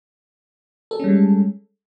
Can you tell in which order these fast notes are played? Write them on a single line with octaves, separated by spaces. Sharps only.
A4 G#4 C#4 G3 G#3